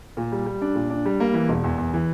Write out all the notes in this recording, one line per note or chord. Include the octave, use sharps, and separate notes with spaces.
A#2
G3
G3
D4
A#2
D4
G3
A#3
E3
E1
E2
E2
E3